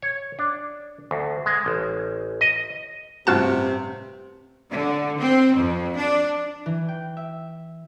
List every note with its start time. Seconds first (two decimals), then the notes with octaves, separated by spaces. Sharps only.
0.02 C#5
0.39 D4
1.11 D2
1.46 G#3
1.66 A1
2.41 D#5
3.27 A1 G2 C3 F4 F#4 A5
4.71 D3
5.19 C4
5.57 F2
5.96 D4
6.66 E3
6.89 G5
7.17 E5